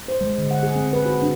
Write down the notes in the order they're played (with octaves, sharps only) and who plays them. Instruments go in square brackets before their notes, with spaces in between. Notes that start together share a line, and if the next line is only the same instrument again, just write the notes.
[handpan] C5
G#3
D3
F#5
G#4
C4
B4
F#4
D4